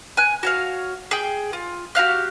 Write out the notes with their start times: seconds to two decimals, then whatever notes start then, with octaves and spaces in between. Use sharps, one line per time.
0.17 G#5 F#6
0.43 F#4 C#5 F5
1.11 G#4 G5
1.53 F4
1.95 F#4 G4 F5 F#6